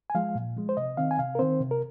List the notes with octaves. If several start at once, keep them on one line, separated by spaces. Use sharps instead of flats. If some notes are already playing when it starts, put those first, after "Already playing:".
G#5
F3 G#3 F5
A#2
F3 G#3
C5
C3 D#5
D#3 C4 F5
G#5
C3 F5
A#4
D#3 C4 C5
C3
A#4